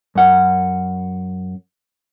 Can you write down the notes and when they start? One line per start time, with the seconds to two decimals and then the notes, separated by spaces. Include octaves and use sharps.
0.15 F#2 F#5